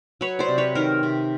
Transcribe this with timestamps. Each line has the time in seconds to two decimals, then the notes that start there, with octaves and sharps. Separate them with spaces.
0.21 F#3 B4 C#5
0.39 C5 D5
0.48 C3
0.58 B4 C#5
0.75 D#3 A#4 C5
1.03 C3